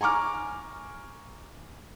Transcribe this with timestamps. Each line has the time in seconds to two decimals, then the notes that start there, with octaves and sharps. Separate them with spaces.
0.01 G#5 A#5 C#6 D6 F6